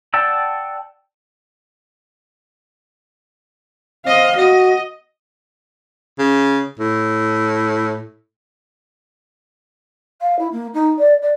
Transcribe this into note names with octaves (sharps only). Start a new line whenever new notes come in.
D5 F#5 G5 A5 E6
C4 D#5 F5
F#4 D#5
C#3
A2
F5
E4
A#3
D#4
D5
D5